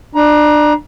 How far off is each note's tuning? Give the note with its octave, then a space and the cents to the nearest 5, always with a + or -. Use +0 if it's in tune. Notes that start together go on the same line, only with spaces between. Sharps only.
D4 +25 A#5 +30